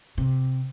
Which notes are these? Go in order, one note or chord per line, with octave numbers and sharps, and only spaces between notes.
C3